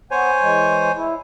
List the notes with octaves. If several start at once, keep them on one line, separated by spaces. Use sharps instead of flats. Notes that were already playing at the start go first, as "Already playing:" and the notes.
B3 C5 C#5 G#5
E3 G#3
E4